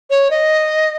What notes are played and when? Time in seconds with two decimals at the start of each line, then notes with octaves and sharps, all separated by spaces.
0.10 C#5
0.30 D#5